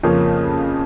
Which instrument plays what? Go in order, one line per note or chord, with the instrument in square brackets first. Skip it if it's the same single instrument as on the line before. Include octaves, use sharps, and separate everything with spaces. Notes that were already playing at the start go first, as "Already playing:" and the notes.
[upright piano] F2 C#3 F3 A#3 C#4